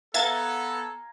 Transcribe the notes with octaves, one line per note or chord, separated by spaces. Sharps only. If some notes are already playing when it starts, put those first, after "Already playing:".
B3 A4 E5 F5 G#5 A#5 G#6 A6